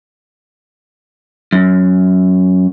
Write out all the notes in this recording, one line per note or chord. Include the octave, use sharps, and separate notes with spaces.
F#2